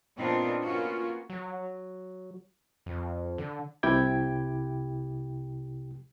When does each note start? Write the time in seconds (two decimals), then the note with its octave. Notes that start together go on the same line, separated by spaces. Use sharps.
0.17 A#2 B3 C4 D4 D#4 F4
0.63 A#3 B3 C#4 F4 F#4
1.30 F#3
2.86 F2
3.38 D3
3.83 C2 C3 E4 G4 G5 G#6